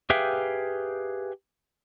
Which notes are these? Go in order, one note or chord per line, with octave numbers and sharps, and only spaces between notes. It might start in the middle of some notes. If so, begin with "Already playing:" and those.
G4 G#4 B4 E5 F5 G5